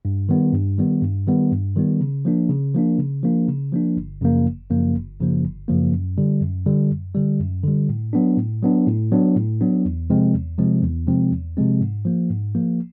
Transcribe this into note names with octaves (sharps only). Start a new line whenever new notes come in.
G2
D#3 G3 B3
G2
D#3 G3 B3
G2
D#3 G3 B3
G2
D#3 G3 B3
C#3
F3 A#3 D4
C#3
F3 A#3 D4
C#3
F3 A#3 D4
C#3
F3 A#3 D4
G1
F#2 C#3 F3 A#3
G1
F#2 C#3 F3 A#3
G1
F#2 C#3 F3 A#3
G1
F#2 C#3 F3 A#3
F#2
D3 G3
F#2
D3 G3
F#2
D3 G3
F#2
D3 G3
A2
F#3 B3 D4
A2
F#3 B3 D4
A2
F#3 B3 D4
A2
F#3 B3 D4
E2
C3 F3 G#3 C4
E2
C3 F3 G#3 C4
E2
C3 F3 G#3 C4
E2
C3 F3 G#3 C4
G#2
F3 A#3
G#2
F3 A#3